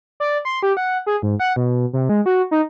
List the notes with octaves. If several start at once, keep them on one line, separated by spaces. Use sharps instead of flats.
D5
C6
G4
F#5
G#4
G#2
F#5
B2
C3
G#3
F#4
D#4